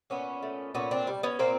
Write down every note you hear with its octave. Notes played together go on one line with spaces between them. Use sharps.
A#2 B3 C#4
A3
A#2 B3 C#4
C4 D4
G3
B3 C#4
A#2 A#3 C4